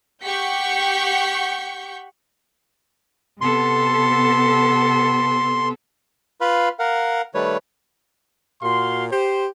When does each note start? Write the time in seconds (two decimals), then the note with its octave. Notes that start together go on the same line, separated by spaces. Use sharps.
0.22 G4 F#5 C#6 G6 B6 C#7
3.41 C3 B3 A4 C6
6.41 F4 B4 F5 B5 C6
6.79 A#4 F5 F#5
7.35 D#3 G3 A3 B4 C#5
8.62 A#2 F#4 F5 C6
9.11 G4 C5